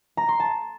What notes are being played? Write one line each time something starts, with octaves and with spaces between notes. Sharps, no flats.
A#5
C6
A5